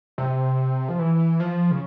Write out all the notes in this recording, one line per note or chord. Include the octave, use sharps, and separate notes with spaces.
C3
F3
E3
F3
C#3